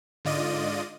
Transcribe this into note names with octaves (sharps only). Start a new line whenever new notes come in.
G#2 D3 F4 D5 D#5 D#7